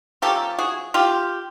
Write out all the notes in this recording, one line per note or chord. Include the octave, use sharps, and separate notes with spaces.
F3 A#3 C#4 G4 A4
F#4 G#4
F4 G4